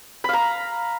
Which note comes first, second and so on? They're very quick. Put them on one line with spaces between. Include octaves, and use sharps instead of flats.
B5 F5 A#5